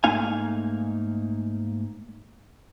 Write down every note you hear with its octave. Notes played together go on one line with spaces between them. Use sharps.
G#2 A3 A#3 D#4 F5 G#5